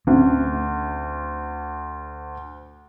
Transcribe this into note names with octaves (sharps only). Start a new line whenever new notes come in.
D2 C4 C#4